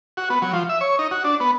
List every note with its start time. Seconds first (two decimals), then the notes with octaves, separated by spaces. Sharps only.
0.17 F#4
0.30 B3
0.42 F#3
0.53 F3
0.69 E5
0.81 C#5
0.99 D#4
1.11 F#4
1.24 D4
1.40 B3